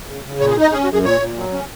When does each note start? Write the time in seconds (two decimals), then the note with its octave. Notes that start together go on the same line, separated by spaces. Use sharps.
0.09 C#3
0.25 C#3
0.41 A#2 C#5
0.51 G#4
0.57 D#4 D#5
0.72 C#4 G#4
0.84 F#4
0.89 F#2
0.94 G#4
1.04 A#2 C#5
1.21 A#2
1.37 F#3
1.52 C#4